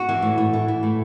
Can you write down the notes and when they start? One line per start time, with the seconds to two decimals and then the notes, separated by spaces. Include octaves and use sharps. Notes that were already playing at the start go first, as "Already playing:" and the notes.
Already playing: F#4
0.09 E3
0.22 A2
0.38 A2
0.53 E3
0.68 E3
0.83 A2